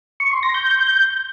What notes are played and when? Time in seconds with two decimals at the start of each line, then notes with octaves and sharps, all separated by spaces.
0.20 C#6
0.32 C6
0.43 A#6
0.54 G6